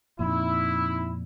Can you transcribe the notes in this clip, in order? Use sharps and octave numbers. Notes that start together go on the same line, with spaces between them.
F2 A#2 C4 D#4 E4